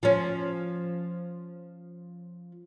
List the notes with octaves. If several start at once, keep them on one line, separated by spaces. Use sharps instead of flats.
F3 C#4